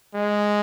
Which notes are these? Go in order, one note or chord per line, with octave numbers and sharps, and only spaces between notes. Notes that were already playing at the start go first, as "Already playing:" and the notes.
G#3